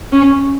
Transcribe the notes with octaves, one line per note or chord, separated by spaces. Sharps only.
C#4